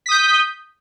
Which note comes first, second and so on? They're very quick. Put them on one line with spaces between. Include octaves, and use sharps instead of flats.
B6 D#6 G6